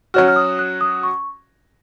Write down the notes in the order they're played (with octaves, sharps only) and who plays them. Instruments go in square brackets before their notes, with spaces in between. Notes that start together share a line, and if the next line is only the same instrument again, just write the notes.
[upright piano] F#3 C#4 F#4 [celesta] F6
[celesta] F6
D#6
F#6
D#6
C#6